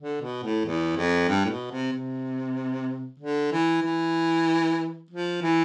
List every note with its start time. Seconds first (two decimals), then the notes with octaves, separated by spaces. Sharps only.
0.01 D3
0.22 B2
0.43 A2
0.65 E2
0.97 F2
1.29 G2
1.45 A2
1.50 B2
1.71 C3
1.93 C3
3.19 D3
3.52 E3
3.83 E3
5.10 F3
5.42 E3